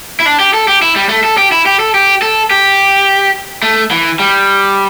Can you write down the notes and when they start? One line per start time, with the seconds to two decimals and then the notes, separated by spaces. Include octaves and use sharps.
0.20 E4
0.26 D4
0.40 G4
0.54 A4
0.68 G4
0.82 E4
0.96 G3
1.09 A3
1.24 A4
1.38 G4
1.52 E4
1.66 G4
1.80 A4
1.94 G4
2.22 A4
2.51 G4
3.63 A3
3.91 E3
4.20 G3